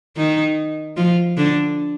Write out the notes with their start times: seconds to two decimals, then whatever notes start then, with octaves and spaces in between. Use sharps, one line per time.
0.17 D#3 D#4
0.97 F3 F4
1.37 D3 D4